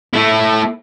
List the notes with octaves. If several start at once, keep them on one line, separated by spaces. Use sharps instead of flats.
A3 E4